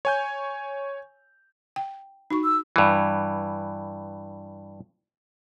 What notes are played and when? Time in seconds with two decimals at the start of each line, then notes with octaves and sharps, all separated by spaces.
0.05 C#5 G#5 G6
1.76 G5
2.31 D#4 F#4 C#6
2.44 E6
2.76 G2 E3